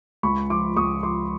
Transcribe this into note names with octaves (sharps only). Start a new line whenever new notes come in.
C#2 B5 C#6
F3 C6 D6
C#2 C#6 D#6
F3 C6 D6